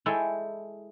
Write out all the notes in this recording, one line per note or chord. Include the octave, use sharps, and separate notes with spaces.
G#3 E4 A4 C#5 G5